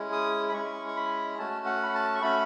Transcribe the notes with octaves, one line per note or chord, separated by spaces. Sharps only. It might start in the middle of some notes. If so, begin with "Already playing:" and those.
Already playing: G#3 C#4 E4 G#4
D#6
B5
G#3 C#4 E4 G#4 C#6
C#6
B5
A3 C#4 F#4 A5
F#5
B5
A5
C#6
A3 C#4 F#4 B5